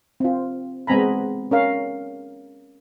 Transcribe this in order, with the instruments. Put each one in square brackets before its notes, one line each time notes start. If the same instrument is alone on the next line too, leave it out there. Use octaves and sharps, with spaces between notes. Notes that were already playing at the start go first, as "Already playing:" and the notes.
[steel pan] C4 F4
G#3 B3 C4 G#5 A#5 B5
C#4 A#4 F5